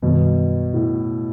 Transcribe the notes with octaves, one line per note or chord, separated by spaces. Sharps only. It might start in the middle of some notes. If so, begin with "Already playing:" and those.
F#2 B2 D#3 G3 B3
A2